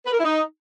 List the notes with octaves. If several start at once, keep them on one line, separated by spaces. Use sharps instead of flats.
B4
A#4
E4
D#4